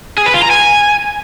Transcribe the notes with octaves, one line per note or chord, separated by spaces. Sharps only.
G#4
B4
F4
A#5
G#5